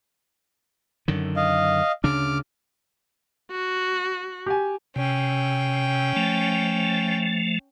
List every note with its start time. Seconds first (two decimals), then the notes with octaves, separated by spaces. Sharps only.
1.08 F#2 D3 D#3
1.36 D#5 F5
2.04 D2 C#3 D4 D6 F6
3.52 F#4
4.46 G4 G#5
4.96 C3 C#4 G5
6.16 F3 A3